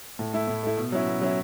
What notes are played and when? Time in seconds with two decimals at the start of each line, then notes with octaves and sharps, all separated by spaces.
0.19 A2
0.33 A3 E4
0.47 A2
0.63 A3 E4
0.77 B2
0.92 F#3 C#4 E4
1.07 B2
1.21 F#3 C#4 E4